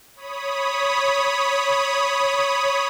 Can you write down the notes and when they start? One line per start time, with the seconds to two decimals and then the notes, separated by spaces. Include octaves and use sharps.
0.15 C#5 B5 D#6